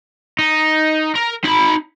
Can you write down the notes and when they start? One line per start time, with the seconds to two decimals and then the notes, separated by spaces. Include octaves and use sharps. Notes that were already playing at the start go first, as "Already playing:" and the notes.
0.39 D#4
1.15 A#4
1.44 D#4 B5